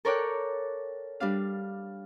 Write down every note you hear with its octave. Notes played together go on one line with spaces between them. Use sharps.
A4 A#4 C#5 D5 G5 F#6
G3 D4 F5